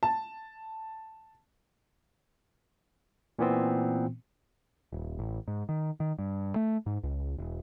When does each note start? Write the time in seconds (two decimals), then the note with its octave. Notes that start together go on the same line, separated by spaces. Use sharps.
0.03 A5
3.39 A#2 E3 B3 C4
4.92 D#1
5.19 A1
5.48 G#2
5.69 D#3
6.00 D#3
6.19 G2
6.56 A3
6.86 G#2
7.03 C#2
7.38 E1